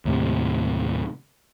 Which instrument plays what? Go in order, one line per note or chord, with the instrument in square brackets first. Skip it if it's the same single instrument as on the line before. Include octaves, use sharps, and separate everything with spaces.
[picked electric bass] D#2 A2 C3